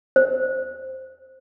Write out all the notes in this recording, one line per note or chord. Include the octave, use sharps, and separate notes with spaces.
C5